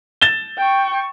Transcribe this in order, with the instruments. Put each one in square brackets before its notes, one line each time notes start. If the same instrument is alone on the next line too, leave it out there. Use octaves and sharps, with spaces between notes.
[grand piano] A6 E7 G7
[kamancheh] G5 C#6